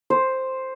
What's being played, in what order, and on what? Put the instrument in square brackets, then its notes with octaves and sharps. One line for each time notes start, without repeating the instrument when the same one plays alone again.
[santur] C5